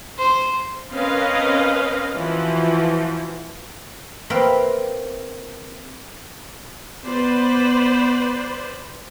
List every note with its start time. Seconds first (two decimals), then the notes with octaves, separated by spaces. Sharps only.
0.19 C5
0.92 C4 C#4 A#4 B4 D#5 F5
2.15 E3 F3 F#4
4.30 A#3 C4 B4 E5 F5 G5
7.05 B3 B4 C5 D5